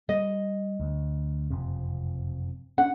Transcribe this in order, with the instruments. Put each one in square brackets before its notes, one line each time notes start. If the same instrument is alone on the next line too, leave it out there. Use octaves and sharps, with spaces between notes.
[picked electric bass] G3 [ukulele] D#5
[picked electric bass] D2
F#1 F2 C3
[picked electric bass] C#4 D4 [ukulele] F#5